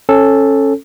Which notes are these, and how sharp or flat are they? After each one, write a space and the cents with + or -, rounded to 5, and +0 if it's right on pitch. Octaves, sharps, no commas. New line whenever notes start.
C#4 -20 A4 +0